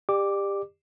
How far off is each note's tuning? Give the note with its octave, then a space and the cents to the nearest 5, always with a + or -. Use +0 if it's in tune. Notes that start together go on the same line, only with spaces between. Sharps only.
G4 +20 D5 +30 D6 +0